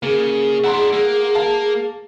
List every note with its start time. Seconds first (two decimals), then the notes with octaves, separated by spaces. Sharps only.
0.03 C#3 A#3 G#4
0.64 D4 E4 F#5 A#5 C6
0.93 A#3
1.35 F5 A5